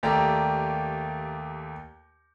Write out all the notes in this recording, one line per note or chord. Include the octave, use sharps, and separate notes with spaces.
D#2 A3 A#3 G4 D5 A#5